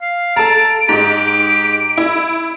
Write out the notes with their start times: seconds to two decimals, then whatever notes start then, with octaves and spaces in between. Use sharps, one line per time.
0.02 F5
0.36 A4 A5 A#5 D7
0.89 G#2 D#4 G4
1.98 E4